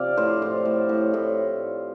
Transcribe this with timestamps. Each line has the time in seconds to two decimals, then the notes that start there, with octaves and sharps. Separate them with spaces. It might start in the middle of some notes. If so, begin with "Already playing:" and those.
Already playing: C3 F3 D5 F5
0.17 A2 C5
0.42 A2
0.65 A2
0.89 A2
1.14 A2